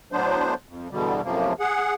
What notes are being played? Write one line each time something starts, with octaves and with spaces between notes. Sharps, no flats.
A2 F#3 B3 D4 C5
F2
E2 B2 D3 G3
F#2 A2 C3 F3 A#3
G#4 F#5